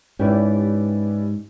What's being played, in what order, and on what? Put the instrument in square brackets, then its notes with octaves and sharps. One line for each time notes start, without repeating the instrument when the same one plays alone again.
[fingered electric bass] G#2 [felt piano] C#4 E4 [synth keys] G4 B4 D5